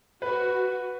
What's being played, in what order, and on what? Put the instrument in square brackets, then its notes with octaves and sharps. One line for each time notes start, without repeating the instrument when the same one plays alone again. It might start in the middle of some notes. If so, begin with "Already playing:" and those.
[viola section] F#4 [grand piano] B4